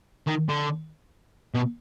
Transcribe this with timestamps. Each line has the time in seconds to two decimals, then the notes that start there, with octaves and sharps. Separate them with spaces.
0.27 D#3
0.49 D3
1.54 B2